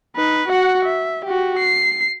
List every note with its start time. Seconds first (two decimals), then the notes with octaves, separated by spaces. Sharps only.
0.16 D#4 B4
0.48 F#4 F#5
0.85 E5
1.25 F#4 G4
1.59 C7